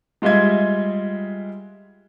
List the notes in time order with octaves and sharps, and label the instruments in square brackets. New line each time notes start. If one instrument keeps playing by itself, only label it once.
[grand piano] G3 G#3 F4 D#5 E5 G#6